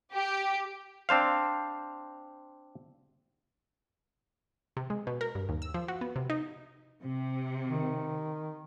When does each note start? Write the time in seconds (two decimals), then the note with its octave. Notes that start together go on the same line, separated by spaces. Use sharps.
0.13 G4
1.09 C4 D4 C5 F5
4.77 C3
4.90 G#3
5.07 B2
5.21 A#4
5.35 G2
5.49 D#2
5.62 E6
5.74 F3
5.88 F#4
6.01 B3
6.16 C3
6.30 D#4
7.01 C3
7.65 D#3